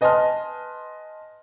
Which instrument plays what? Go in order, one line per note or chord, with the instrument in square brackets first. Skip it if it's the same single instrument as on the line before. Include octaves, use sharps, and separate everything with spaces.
[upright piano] B4 D#5 G#5 A5 C6 F6